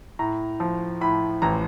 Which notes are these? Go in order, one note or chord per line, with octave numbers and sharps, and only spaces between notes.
A2 A#5
F3
A2 B5
A1 A#5